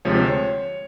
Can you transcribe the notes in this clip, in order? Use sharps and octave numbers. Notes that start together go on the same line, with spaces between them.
D2 C3 F3 G#3 C#5
C5
C#5